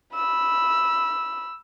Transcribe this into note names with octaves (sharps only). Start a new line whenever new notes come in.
B5 E6